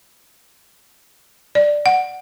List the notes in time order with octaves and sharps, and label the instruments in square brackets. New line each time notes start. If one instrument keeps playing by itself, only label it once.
[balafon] D5
F#5